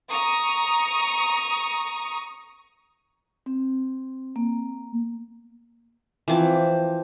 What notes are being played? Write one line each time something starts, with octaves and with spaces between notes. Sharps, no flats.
A#5 C#6 D#6
C4
A#3
E3 F3 C4 D6